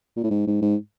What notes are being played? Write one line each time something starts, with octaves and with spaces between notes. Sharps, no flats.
A#2
A2
G#2
G#2
G#2